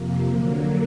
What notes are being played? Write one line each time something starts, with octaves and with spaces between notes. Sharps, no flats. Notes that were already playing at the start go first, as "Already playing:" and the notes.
Already playing: F2 C3 F3 A#3
D3 F#3 A#3